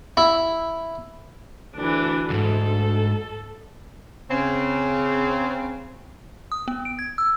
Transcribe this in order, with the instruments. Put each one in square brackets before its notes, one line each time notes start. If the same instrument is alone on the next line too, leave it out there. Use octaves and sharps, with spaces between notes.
[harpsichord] E4
[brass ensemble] D2 [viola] E3 D4
[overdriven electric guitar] D#2 G#2 [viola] A4
[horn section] C#3 C4
[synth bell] D#6
B3
D7
G#6
E6